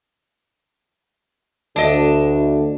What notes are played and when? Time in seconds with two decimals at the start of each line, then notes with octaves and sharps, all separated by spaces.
1.76 D2 D4 D#5